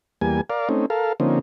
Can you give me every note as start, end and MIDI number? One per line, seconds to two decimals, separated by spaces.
0.21 0.41 40
0.21 0.41 55
0.21 0.41 58
0.21 0.41 80
0.50 0.69 70
0.50 0.69 74
0.50 0.69 77
0.69 0.86 57
0.69 0.86 60
0.69 0.86 61
0.69 0.86 63
0.90 1.13 69
0.90 1.13 70
0.90 1.13 77
1.20 1.39 50
1.20 1.39 53
1.20 1.39 58
1.20 1.39 60
1.20 1.39 61
1.20 1.39 63